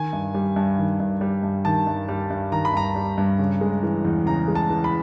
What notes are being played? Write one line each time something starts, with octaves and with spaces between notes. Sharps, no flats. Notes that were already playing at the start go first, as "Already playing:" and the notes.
Already playing: D#3 G#5
G2
G3
G2
D#3
G2
G3
G2
D#3 A5
G2
G3
G2
D#3 A#5
B5
G2 A#5
G3
G2
C#3
G#3
E3
E2
C#3 A#5
G#3
A5
E3
B5